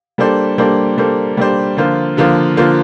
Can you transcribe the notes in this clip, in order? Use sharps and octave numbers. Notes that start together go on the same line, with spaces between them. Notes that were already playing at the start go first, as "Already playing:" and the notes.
G3 A#3 D4 A4 C5
G3 A#3 D4 A4 C5
G3 A#3 D4 A4 C5
G3 A#3 D4 A4 C5
D3 F3 A#3 F4 C5
D3 F3 A#3 F4 C5
D3 F3 A#3 F4 C5